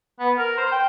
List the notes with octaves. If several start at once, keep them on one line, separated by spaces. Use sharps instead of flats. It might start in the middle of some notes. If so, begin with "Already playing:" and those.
B3
A#4
C5
G5